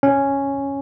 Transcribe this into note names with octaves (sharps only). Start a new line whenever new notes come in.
C#4